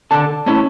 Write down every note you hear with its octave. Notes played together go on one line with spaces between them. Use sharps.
D3 A5
A3 C#4 E4